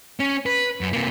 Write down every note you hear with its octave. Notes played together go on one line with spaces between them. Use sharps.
C#4
B4
F#2
C3 A#3